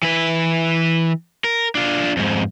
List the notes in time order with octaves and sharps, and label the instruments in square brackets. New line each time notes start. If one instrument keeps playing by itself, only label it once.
[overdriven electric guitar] E3 B4
A#4
D4 F4
F2 G#2